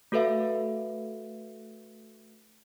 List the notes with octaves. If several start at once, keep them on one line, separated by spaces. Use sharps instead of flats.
A3 F#4 A4 B4 E5 F5